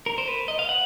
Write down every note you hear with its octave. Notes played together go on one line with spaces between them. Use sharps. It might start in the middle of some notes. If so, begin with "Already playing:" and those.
A#4
C5
B4
D#5
F5
F#5